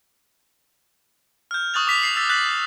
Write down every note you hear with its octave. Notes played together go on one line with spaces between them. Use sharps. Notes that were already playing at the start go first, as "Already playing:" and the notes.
F6 G6
C#6 D#6 F#6 A6 F7
C#6 D6 B6 F7
C7 F7
E6 A6 B6 F7
F#6 A6 B6 F#7